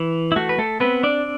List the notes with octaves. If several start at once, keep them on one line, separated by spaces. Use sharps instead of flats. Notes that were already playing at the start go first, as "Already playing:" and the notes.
Already playing: E3
E4
A3 F#4
B4
A3 A4
B3 C4 B4
D4 D5